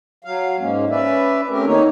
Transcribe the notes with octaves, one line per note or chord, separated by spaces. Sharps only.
F#3 F5
G#2 G#3 A#3 C#4
C#4 B4 D5 E5
A3 C4 C#4 G4 A#4
D#3 A#3 D#4 C#5